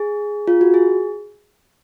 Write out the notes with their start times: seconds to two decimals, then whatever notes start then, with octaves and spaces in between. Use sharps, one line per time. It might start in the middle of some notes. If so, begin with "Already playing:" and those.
Already playing: G#4
0.48 F4
0.61 F#4
0.74 G#4